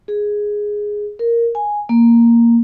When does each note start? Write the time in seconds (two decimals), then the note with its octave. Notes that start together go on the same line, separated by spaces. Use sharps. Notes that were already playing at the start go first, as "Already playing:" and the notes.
0.08 G#4
1.19 A#4
1.55 G#5
1.89 A#3